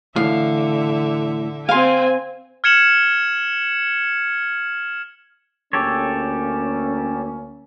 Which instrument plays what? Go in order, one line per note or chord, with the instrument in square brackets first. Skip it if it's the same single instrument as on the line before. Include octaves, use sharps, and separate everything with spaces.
[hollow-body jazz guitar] A2 E3 [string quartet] D3 E5 [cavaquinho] F5
[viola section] C4 G#5 [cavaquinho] F5 C6
[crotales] F6 G#6 C#7 E7 F#7
[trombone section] D2 A#3 C#4 [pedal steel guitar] G4 A4 C#5